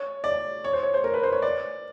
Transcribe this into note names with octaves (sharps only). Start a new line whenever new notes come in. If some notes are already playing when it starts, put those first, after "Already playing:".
Already playing: C#5
D5
C#5
C5
C#5
C5
A#4
B4
C5
C#5
D5